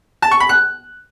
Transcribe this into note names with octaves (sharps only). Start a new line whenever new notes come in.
A5
C#6
B5
F#6